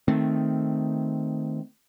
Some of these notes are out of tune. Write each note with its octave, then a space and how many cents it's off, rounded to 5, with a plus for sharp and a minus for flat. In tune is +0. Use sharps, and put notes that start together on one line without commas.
D#3 +0 A3 +0 C4 +0